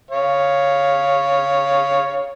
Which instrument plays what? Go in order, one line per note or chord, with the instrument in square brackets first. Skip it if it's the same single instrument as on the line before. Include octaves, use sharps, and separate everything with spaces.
[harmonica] C#5 F5